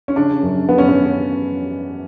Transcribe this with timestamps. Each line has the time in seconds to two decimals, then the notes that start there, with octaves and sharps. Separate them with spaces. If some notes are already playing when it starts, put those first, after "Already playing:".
0.08 C#4
0.16 C#3 D4
0.43 F#2
0.69 F#2 B3
0.78 C#4
0.89 B3